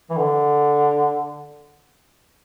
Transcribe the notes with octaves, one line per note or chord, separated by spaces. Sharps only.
E3
D3